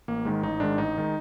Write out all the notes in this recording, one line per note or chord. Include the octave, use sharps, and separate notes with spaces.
A1 A#3
G#2 D#3 G#3
A1 D#4
G#2 D#3 G#3 D4
A1 D#4
D#3 G#3